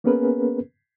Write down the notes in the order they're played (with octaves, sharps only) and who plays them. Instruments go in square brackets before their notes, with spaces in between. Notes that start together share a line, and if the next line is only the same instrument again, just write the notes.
[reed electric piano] A#3 B3 C#4 G#4 A#4 B4